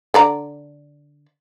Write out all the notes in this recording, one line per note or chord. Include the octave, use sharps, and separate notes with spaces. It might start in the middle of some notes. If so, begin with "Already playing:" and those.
D3 D5 A#5